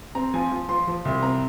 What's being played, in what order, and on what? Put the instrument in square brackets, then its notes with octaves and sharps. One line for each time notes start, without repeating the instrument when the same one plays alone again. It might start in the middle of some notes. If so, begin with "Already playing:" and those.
[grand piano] C4 A#5
F3 G#5
F3
F3 C6
F3
C2
C4 A#5